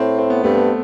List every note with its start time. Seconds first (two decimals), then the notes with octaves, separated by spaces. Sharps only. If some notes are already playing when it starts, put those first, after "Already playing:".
Already playing: A2 C4
0.19 C4
0.30 B3
0.44 G2 A3
0.56 B3